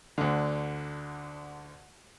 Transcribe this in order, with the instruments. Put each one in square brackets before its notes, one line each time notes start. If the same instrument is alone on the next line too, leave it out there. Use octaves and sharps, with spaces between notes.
[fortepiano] D2 D3